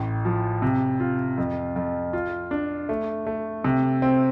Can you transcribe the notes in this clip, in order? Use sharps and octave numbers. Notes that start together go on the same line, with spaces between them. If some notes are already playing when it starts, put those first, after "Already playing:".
Already playing: A1 A2
F3
C3
F4
F2
F2
F4
D4
A3
A3
C3
C4